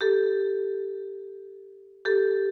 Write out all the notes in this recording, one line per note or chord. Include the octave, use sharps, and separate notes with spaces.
G4 A4
G4 A4